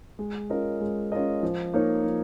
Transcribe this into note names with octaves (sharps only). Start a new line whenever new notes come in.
G#3
C#4 F4 A#4 D#5
G#3
C#4 F4 A#4 D#5
F3
A#3 D#4 A#4 C#5
F3